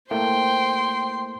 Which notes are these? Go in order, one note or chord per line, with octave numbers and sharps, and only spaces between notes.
A3 A#3 E4 C5 G5 C6